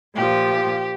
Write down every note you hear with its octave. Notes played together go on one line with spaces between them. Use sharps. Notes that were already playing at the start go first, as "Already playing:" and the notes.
A#2 F3 G4